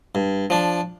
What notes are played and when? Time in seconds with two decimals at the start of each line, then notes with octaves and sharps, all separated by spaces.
0.15 G2
0.50 F3 D4